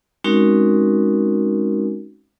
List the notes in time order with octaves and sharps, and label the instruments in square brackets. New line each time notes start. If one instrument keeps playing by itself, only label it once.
[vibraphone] G#3 C4 C#4 D#4 F#4 A#4